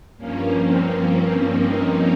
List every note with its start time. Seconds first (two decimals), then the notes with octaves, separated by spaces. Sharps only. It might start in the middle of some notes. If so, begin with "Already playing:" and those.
0.17 G2 F3 A#3 C#4
0.61 C4
1.49 C4 D#4